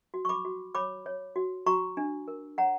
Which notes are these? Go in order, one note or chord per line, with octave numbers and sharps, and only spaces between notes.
F#4
C#6
B5 D6
F#4
C#5 B5 D6
C#5
F#4
F#4 A#5 C#6
D4
A#4
C#5 F#5 A#5